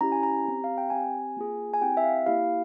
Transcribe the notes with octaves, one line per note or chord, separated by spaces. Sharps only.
C#4 E4 G4 A#5
G#5
A#5
C4 G4
F5
G5
C4 G4 G#5
A#3 F4 G#4
G#5
C4 E4 G4 G5
E5
F5
A#3 E4 G4 F5